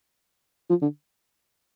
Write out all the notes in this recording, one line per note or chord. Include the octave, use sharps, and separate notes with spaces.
F3
D3